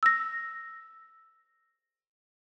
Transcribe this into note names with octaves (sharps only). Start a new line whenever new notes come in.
E6 A#6